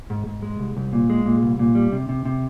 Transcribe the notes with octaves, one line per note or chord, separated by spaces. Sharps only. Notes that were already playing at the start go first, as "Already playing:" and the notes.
G#2
G#2
G#3
C2
C2
A#2
G#3
A#2
C2
A#2
G3
C3
C3
C3